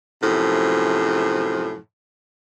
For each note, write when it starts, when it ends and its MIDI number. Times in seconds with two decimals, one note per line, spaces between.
0.22 1.78 42
0.22 1.78 45
0.22 1.78 48
0.22 1.78 53